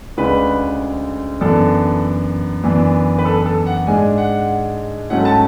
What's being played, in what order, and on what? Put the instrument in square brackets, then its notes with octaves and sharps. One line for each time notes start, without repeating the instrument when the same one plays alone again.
[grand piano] D2 C#3 G#3 D4 B4
F#2 E3 B3 D4 A4
F#2 E3 B3 D4
B4
A4
A4
F#5
G#2 G#3 D4 G#5
F#5
G#2 F#3 A3 C#4 F#5
A5